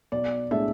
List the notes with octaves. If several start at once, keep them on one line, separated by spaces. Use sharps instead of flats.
B1 D5
A2 G#3 D4 E5